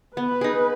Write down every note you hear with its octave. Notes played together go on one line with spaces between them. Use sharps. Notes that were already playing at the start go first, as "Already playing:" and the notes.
B3 B4
D#4 G#4